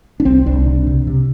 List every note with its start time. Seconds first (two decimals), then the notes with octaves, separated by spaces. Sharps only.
0.20 D4
0.25 C2 C4
0.46 C2 D4
0.66 C3
0.87 C3
1.07 C3